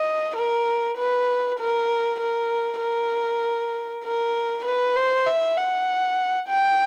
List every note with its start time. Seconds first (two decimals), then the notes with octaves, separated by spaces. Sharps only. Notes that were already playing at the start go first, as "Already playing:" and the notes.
Already playing: D#5
0.36 A#4
0.97 B4
1.60 A#4
2.20 A#4
2.81 A#4
4.05 A#4
4.65 B4
4.96 C5
5.26 E5
5.57 F#5
6.49 G5